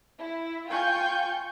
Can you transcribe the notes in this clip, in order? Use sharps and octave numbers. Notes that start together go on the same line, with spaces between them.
E4
F4 G5 G#5 C#6 G6